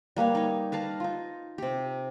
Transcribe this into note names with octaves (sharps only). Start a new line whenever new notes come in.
G3 A#3 B4 C#5
D#4 C#5
B4 F5 A5 A#5
D#4 F4
C3 G4